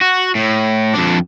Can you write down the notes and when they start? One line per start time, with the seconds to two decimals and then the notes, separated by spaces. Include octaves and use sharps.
0.01 F#4
0.35 A2
0.94 F2 D4